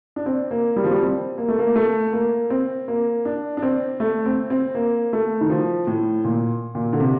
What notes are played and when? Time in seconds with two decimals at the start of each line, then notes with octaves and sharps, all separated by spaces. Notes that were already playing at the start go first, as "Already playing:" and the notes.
0.16 D4
0.26 C4
0.51 A#3
0.76 G3
0.84 F3
0.91 G3
1.01 C4
1.38 A#3
1.48 A3
1.59 A#3
1.76 A3
2.13 A#3
2.50 C4
2.88 A#3
3.25 D4
3.57 D4
3.63 C4
4.00 A3
4.26 C4
4.50 C4
4.75 A#3
5.13 A3
5.41 D#3
5.50 F3
5.87 A2
6.24 A#2
6.75 A#2
6.93 D3
7.00 C3